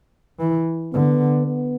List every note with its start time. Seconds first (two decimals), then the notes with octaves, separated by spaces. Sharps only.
0.39 E3
0.93 D3 B3
1.47 B3